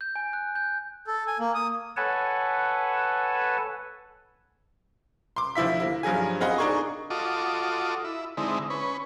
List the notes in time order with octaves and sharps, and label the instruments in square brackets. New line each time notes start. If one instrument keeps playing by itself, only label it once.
[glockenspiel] G6
G#5
F#6
G6
[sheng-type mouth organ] A4
G#5
A#3
D#6
[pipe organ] A4 B4 C#5 F#5 G#5 A5
[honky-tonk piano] C6 D6
D2 F3 E4 E5 B6
A#3 E4
G2 F3 F#3 G#4 G#5
C4 F4 G#4 D#5 F#5 B5
D4 D#4 G#4 A#4 C#6
[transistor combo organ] F4 F#4 A4 D#5 D6
E4
D3 G#3 C4 D#4 E4
C#4 B4